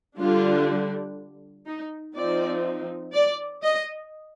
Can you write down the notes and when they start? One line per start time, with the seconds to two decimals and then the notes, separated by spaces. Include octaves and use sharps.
0.19 D3 G3 D4 F4
1.66 D#4
2.16 F3 C4 D#4 D5
3.14 D5
3.63 D#5